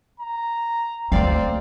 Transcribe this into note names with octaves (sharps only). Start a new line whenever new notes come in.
A#5
D2 A#3 C4 D5 F5